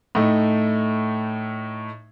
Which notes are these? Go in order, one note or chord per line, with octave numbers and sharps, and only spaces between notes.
A2 A3 D#4